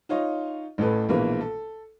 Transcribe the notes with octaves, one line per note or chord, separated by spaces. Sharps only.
D#4 F4 C#5 D#5
A1 A2 A4 B4
A#1 B2 E3 G#3 A#3 B4
A4